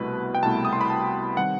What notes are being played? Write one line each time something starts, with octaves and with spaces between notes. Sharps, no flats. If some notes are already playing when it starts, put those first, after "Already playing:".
Already playing: C2 B2 A3 E4 B4
G5
C2 B2 A3 E4 A5
D#6
C6
B5
A5
D#3 G3 C4 F#5